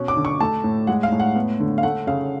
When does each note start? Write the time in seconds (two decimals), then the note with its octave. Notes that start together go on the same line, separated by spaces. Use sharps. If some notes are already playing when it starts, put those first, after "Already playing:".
Already playing: B2 C#4
0.08 D6
0.16 D3
0.25 C#6
0.40 A3 A5
0.64 A2
0.87 G#3 F#5
1.03 F5
1.12 A2
1.20 F#5
1.35 B3
1.60 D3
1.78 F5
1.83 A3 F#5
2.07 C#3 F5